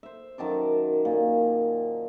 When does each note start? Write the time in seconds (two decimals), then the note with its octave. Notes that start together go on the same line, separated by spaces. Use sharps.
0.03 C5 E5
0.38 F#2 D#3 A5 D6
1.05 A#2